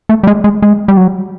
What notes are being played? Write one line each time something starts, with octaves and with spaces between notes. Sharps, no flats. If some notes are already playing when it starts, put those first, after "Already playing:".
A3
G3
G#3
G#3
G#3
G3
F#3